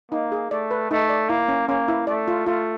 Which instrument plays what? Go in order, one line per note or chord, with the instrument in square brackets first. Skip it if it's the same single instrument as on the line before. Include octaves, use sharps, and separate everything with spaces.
[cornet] A#3 [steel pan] D#4
[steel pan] G#4
[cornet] A3 [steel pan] D5
[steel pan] B4
[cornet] A3 [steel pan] D#4
[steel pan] D5
[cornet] A#3 [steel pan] E4
[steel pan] C#4
[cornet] A#3 [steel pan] C#4
[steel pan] E4
[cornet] A3 [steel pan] D5
[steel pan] F4
[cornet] A3 [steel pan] F4